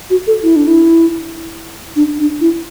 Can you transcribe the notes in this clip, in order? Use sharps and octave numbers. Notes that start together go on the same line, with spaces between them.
F#4
A4
E4
D4
E4
D4
D4
E4